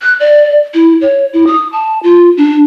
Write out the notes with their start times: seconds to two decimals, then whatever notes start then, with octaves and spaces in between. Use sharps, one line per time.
0.02 F#6
0.20 D5
0.74 E4
1.01 C#5
1.33 E4
1.47 D#6
1.73 A5
2.03 F4
2.37 D4